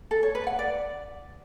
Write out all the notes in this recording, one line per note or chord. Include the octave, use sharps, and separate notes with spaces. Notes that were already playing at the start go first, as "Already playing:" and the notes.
A4
C#5
B4
F#5
D5